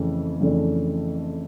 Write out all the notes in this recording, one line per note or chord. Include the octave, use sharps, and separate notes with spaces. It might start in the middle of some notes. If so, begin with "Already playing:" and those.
Already playing: F2 C#3 E3 A3
F2 C#3 E3 A3 D4